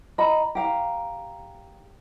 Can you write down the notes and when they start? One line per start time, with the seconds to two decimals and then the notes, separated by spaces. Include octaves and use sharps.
0.18 D#5 A#5 B5
0.55 G4 F5 A#5